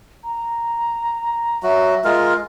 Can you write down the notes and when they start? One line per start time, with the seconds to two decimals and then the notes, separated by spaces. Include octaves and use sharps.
0.24 A#5
1.63 F#3 F#4 E5
2.04 G#3 F4 A#4